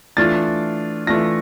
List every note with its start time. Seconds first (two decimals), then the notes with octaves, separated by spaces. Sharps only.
0.17 E3 A3 D4 F4 A6
1.07 E3 A3 D4 F4 A#6